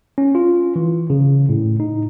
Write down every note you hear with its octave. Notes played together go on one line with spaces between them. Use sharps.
C#4
F4
E3
C#3
A2
D#4